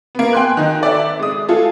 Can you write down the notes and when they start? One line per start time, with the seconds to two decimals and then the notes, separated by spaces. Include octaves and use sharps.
0.15 A#3 B3
0.33 G5 G#5 C6 F#6
0.57 D#3 D#4
0.81 A4 D5 E5
1.20 G#3 D#6
1.49 G#3 A3 F4 G#4 A4